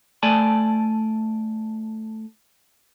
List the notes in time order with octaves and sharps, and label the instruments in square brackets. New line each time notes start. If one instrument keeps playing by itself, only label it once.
[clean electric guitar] A3 D5 G#5 A5